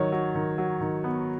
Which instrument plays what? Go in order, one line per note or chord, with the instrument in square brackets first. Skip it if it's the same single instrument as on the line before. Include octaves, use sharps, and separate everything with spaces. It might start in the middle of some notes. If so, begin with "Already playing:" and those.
Already playing: [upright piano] D#3 F#3 [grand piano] C#5
[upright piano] F#3
D#3
F#3
D#3
B3